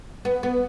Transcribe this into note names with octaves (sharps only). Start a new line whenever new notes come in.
B3
B3